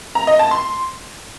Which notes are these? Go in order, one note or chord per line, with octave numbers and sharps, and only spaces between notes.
A#5
D#5
A5
C6